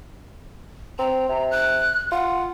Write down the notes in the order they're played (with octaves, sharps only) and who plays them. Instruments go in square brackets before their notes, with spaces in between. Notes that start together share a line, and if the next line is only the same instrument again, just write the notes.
[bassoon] C4 [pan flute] A#5
[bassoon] C3
[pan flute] F#6
[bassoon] F4 [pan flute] F#5